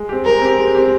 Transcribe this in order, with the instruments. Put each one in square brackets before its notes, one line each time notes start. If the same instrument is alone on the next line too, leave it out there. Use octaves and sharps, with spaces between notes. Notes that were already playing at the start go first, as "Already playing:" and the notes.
Already playing: [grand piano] G#3
C4 G4
[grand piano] G#3 [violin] A#4
[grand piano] C4 G4
G#3
C4 G4